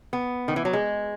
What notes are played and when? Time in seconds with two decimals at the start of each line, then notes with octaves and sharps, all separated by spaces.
0.13 B3
0.48 D#3
0.56 E3
0.65 F#3
0.73 G#3